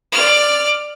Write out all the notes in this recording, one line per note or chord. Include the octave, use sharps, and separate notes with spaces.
D5 F6